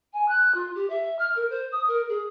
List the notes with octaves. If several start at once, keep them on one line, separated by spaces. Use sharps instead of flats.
G#5
F#6
F4
G4
E5
F6
A#4
C5
D#6
A#4
G#4